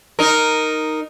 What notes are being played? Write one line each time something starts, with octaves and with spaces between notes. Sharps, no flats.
D#4 A#4